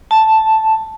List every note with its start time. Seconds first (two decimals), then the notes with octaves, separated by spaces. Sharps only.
0.11 A5